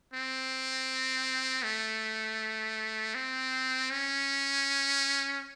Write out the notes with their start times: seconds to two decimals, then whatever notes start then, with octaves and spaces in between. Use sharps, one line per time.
0.14 C4
1.64 A3
3.15 C4
3.90 C#4